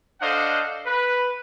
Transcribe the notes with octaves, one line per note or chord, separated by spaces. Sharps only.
D4 A4 C5 D#5 F5 F#5
B4